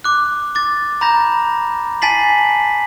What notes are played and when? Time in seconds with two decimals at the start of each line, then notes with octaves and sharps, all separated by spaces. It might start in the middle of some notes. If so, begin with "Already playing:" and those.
0.04 D6 F#6
0.55 D6 A6
1.01 A#5 B5 G6 A#6
2.02 G#5 A5 A6 B6 C7 F#7